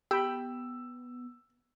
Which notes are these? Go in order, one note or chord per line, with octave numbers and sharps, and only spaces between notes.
B3 G4 G5 B5 E6